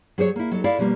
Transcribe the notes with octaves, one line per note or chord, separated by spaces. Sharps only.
F#3 G#4 C5 C#5
A#3 E4
F#3 D#4 A4
E4 A4 D5 F5
B2 F3 G3 G#3 A#3